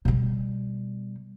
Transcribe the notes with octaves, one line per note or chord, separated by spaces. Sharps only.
B2 G3